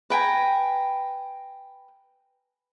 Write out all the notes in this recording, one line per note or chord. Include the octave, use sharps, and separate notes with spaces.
B4 G5 G#5 A#5